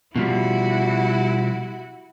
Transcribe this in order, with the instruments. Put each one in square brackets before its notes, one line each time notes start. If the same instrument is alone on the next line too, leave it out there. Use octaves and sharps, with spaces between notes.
[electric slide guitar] B2 F3 G3 [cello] E4 F#4